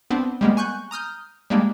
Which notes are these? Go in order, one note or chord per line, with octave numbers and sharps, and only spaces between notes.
B3 C4 D4
G3 G#3 A#3 B3
G#5 C#6 F#6 G6
A#5 D#6 F6 G6
G3 G#3 A#3 D4